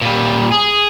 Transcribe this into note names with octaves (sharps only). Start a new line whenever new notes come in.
A#2 G3
G#4